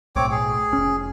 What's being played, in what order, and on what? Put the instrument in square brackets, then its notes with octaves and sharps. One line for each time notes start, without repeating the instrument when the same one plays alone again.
[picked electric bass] B1 A2 [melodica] C4 C#5 D6
[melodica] G#4
[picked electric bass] F1 C#4